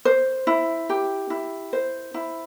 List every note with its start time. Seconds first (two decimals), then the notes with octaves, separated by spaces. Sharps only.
0.05 C5
0.47 E4
0.90 G4
1.30 E4
1.73 C5
2.14 E4